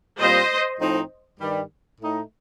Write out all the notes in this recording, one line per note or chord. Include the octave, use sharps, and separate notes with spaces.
A#2 G3 C4 F4 C5 D#5
A2 F3 C4 D#4
G2 D#3 G3
A2 A3 D#4